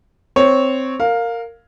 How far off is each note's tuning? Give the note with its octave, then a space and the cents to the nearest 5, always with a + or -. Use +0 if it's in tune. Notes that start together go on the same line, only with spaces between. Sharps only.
C4 -5 C#5 +0
A#4 -15 F5 +10